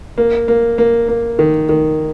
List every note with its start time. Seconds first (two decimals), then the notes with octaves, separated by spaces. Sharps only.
0.18 A#3
0.48 A#3
0.78 A#3
1.08 A#3
1.39 D#3
1.69 D#3